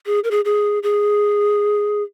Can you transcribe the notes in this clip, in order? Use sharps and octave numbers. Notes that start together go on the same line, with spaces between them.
G#4
A#4
G#4
G#4
G#4